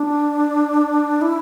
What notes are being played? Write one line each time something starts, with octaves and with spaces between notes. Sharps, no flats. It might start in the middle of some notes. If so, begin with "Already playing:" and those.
Already playing: D4
E4